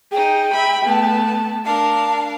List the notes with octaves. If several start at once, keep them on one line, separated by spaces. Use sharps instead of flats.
D#4 G#4 G5
E5 B5
A3 B3 A5
D4 A#4 F5 A5